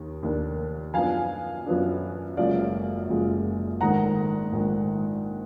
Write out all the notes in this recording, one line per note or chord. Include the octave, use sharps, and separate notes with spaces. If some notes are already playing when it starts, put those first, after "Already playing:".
Already playing: D#2 D#3
D#2 D#3 A#3 D4
F#2 F3 B3 D4 F5 G#5
F#2 F3 B3 D4
F#1 F#2 F3 G#3 D5 F5
F#1 F#2 F3 G#3
A#1 G#2 D#3 F#5 A#5
A#1 G#2 D#3